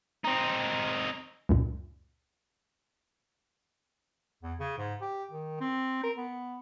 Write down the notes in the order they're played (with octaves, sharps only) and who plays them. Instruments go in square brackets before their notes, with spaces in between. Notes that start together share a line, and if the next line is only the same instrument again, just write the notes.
[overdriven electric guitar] C4 D#4
[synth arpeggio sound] C#2 F#2 A#2
[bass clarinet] E2
C#3
G#2
G4
D#3
C4
A#4
B3